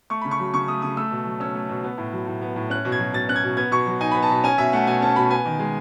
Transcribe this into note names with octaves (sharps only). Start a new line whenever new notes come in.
A3 C#6
C#3 B5
C#6
F#3
C#3 C#6
A3 D#6
C#3 D#6
A3 E6
B2
F#3
C#4 E6
A3
B2
B3
A2
F#3
A2
B3
A2
C#4 F#6
B2
G#6
F#3
B2 A6
C#4 F#6
G#6
B2
B3 G#6
B2 C#6
F#3
D#4 G#5
B3 B5
A5
B2
C#4 G#5
B2 E5
A3 F#5
B2 G#5
C#4 A5
B2 B5
B3 G#5
D#3
G#3